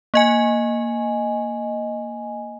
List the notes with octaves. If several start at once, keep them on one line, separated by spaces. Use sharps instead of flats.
A#3 D#5 G#5